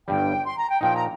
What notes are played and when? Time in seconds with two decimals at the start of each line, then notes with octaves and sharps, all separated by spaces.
0.08 G1 G2 G3 G5
0.44 C6
0.57 A#5
0.69 G5
0.81 A#2 F3 D#4 G5
0.94 A#5